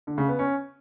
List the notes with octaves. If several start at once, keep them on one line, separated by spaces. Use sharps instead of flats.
D3
C#3
B3
C#4